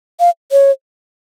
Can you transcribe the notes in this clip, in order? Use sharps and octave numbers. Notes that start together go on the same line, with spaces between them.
F5
C#5